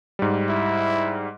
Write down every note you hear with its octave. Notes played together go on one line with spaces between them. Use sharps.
G#2 G3
E4